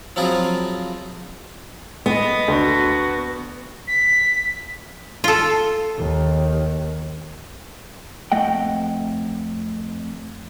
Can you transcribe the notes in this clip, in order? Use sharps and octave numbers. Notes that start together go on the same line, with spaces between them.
F3 F#3 C4 E4 F4 G#4
B3 D#5
D2 F#4
B6
F4 A4
D#2
F2 A3 D#5 F#5 G5